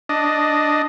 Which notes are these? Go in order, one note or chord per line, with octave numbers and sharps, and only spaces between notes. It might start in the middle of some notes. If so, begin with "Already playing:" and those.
D4 D#5